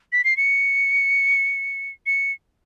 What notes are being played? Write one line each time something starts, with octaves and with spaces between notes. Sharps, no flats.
B6
C7
C#7
C#7